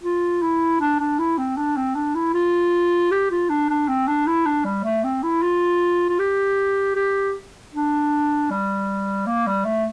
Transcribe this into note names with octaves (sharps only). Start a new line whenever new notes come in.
F4
E4
D4
D4
E4
C4
D4
C4
D4
E4
F4
G4
F4
D4
D4
C4
D4
E4
D4
G3
A3
C4
E4
F4
F4
G4
G4
D4
G3
A#3
G3
A3